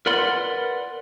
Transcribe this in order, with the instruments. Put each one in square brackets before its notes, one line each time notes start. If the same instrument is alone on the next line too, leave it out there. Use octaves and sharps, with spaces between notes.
[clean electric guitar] A#4 B4 D5 F#5 B5 C6